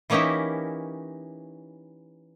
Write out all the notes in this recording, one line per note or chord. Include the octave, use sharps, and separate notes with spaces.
E3 A#3 C#4 D#4 E4 G4